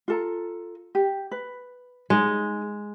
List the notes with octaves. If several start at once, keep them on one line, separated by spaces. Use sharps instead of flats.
F4 A4 A#5
G4
B4
G#3 D#4 G#4